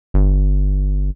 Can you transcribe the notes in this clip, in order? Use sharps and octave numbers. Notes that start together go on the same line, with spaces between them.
G1